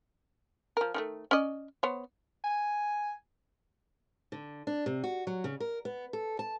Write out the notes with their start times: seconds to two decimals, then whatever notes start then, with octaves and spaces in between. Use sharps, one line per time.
0.77 F3 A#4
0.94 D#3 F3 A3
1.31 C#4 D5 D#5
1.83 B3 C5 C#5
2.44 G#5
4.32 D3
4.67 D4
4.86 C3
5.04 F#4
5.27 F#3
5.44 C#3
5.60 A#4
5.85 B3
6.13 A4
6.39 A5